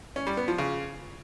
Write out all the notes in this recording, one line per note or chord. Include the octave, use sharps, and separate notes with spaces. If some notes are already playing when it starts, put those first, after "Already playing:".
C#4
G3
B3
F3
C#3